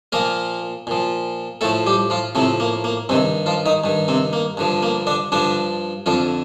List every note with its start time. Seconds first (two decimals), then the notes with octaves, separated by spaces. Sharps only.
0.12 A#2 F3 A#3 A#4
0.87 A#2 F3
1.61 A2 F3 A3 A4
1.87 G3 G4
2.10 F3 F4
2.35 A2 C3 F3 C4
2.60 A#3
2.84 A#3
3.09 G2 C3 D#3 C4
3.46 F3 F4
3.66 D#3 D#4
3.84 G2 D#3
4.08 C3 C4
4.33 A#3
4.57 G2 D3 F3
4.82 A#3
5.07 D3 D4
5.32 G2 D3 F3 D4
6.06 F2 D3 F3 F4